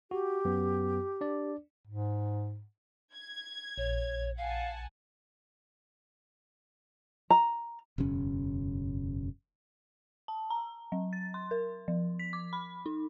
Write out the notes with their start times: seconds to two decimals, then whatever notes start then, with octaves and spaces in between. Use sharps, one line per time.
0.11 F#4 G4
0.45 F#2 F#3 B3
1.21 D4 D5
1.87 G#2
3.13 G#6
3.78 A#1 C#5
4.38 F5 F#5 G#5 A5
7.30 A#5
7.98 E1 F#2 C#3 C#4
10.28 A5
10.50 A#5
10.92 F#3
11.13 A6
11.34 C6
11.51 A#4
11.88 F3
12.19 B6
12.33 D6
12.53 B5
12.86 D#4